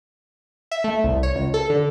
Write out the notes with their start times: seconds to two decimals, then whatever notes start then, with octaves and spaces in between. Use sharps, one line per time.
0.71 E5
0.84 A3
1.04 C2
1.23 C#5
1.35 C#2
1.54 A4
1.70 D3